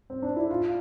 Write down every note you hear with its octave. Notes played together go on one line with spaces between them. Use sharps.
C4
D4
E4
F4